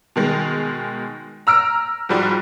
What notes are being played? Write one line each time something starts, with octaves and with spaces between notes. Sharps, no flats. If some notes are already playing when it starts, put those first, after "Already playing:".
B2 D#3 G#3
A#5 E6 F6 D7
G#2 F3 G3 F#4